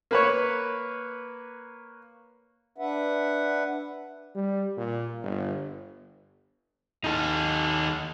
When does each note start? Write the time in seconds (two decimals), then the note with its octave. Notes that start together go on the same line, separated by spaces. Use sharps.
0.11 A#3 B4 C#5
2.78 D4 B4 E5 F#5
4.35 G3
4.77 A#2
5.22 G1
7.04 D#2 D#4 G#4 A4